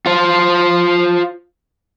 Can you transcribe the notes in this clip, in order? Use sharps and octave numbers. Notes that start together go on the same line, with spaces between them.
F4 C5